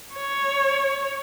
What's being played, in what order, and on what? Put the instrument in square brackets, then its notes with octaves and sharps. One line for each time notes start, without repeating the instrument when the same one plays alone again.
[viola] C#5